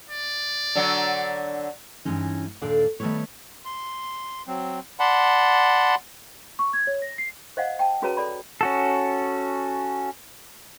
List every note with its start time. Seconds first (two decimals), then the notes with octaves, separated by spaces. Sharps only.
0.10 D5
0.75 D3 F#3
2.05 G2 E3 G#3 C#4 D#4
2.62 D#2 A#2 D4 A4 D5 F5
3.00 D#3 G3 A3 B3 B4 C#5
3.65 C6
4.47 F#3 C4
5.00 D5 F#5 A5 B5 C6
6.59 C#6
6.73 G#6
6.87 C#5
7.02 A#6
7.18 C7
7.57 C5 D#5 F5 F#5
7.79 G5 A5
8.02 C#4 F#4 G#4 B4 C#5 A#5
8.17 A4 D5 B5
8.61 C#4 F#4 A4